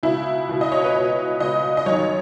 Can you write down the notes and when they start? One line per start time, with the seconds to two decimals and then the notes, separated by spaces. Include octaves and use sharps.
0.03 C#2 B2 E4
0.49 C#2 B2
0.61 D#5
0.72 C#5
0.84 B4
0.95 C#2 B2
1.40 C#2 B2 D#5
1.77 D#5
1.86 F#2 D#3 C#5